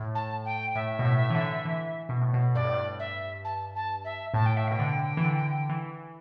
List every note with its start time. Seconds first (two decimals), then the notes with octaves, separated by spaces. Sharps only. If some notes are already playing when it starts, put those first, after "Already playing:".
Already playing: A2
0.15 A5
0.45 G5
0.75 A2 E5
0.99 B2
1.05 A2
1.30 E3
1.35 D3
1.55 D3
1.65 E3
2.09 B2
2.22 A2
2.33 B2
2.55 G2 D5
2.64 A2
2.74 G2
2.99 E5
3.45 A5
3.75 A5
4.04 E5
4.34 A2 A5
4.46 G5
4.57 E5
4.68 B2 G5
4.79 D3
5.17 E3
5.25 D3
5.69 E3